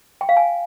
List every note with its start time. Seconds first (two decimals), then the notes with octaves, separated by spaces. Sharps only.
0.21 G5
0.29 F5
0.37 G#5